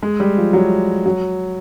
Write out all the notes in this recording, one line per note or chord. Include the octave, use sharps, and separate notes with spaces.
G#3
G3
F3
F#3
F#3